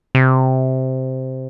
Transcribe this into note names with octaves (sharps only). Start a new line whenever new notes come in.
C3